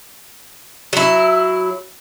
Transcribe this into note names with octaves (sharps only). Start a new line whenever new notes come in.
F#3 E4